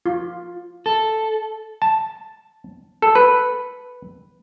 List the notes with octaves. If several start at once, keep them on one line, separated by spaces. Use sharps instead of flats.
F4
A4
A5
A4
B4